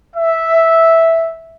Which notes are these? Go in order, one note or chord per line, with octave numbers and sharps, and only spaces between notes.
E5